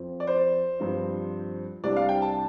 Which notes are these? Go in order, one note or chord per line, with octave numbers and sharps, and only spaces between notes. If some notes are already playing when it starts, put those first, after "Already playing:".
Already playing: F2 F3 C4
D5
C5
G2 F3 C4
C2 C3 G3 D4 D5
F5
G5
A5